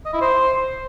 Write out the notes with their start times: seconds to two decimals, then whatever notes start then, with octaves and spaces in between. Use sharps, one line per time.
0.06 D#5
0.13 E4
0.21 C5